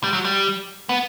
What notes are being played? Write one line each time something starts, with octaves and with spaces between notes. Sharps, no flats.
G3
F#3
G3
B3